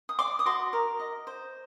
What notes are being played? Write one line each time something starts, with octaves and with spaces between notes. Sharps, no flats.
D#6
D5 C6 D6
D#6
F#4 C6 D6
A#4
D#5
C5